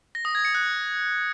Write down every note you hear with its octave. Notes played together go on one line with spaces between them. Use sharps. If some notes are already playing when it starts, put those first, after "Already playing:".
A#6
D#6
G#6
C#7
F#6